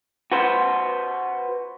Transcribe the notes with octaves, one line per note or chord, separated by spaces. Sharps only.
F#4 B4 C5